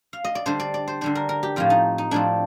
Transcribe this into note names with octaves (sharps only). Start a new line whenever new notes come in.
F5
D#5
D5
D3 G3 D4 C5
D5
D5
C5
D3 G3 D4 C5
A#4
A#4
G4
A2 F3 C4 F4
D#4
D#4
A2 F3 C4 D4